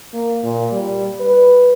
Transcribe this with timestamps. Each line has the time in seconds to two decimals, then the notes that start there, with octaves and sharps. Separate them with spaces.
0.13 A#3
0.43 A#2
0.72 G3
1.21 B4